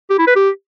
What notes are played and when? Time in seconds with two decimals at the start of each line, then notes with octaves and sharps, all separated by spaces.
0.10 G4
0.18 E4
0.27 B4
0.35 G4